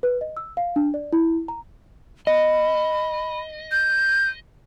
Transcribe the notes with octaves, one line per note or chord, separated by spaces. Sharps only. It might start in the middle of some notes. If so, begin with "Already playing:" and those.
B4
D#5
E6
F5
D4
D5
E4
A#5
D#5 B5
G6